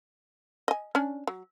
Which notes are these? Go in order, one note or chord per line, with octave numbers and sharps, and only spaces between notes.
D#5 G#5
C#4 D4
F#3